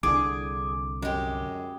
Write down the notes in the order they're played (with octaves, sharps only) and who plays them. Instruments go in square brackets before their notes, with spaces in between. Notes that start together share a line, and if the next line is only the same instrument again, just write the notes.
[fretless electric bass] C2 D3 D4 [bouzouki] G#4 [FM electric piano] D6
[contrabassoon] F#2 [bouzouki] G#3 G4